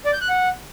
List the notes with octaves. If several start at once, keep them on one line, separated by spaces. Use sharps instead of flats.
D5
G6
F#6
F#5